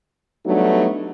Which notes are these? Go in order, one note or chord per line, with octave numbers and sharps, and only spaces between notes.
F#3 G3 A3 B3 D4 D#4